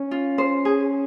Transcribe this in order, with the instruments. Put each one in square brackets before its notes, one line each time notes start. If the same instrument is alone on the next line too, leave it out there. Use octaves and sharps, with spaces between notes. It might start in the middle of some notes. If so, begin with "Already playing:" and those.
Already playing: [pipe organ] C#4
[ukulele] F4
C5
G#4